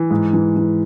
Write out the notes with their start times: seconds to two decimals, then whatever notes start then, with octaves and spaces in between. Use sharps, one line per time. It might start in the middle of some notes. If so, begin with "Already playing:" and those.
Already playing: E3
0.11 G#2
0.33 E3
0.56 E3